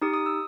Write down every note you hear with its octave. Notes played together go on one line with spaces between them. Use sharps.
D#4 G4 D#6
D#6
E6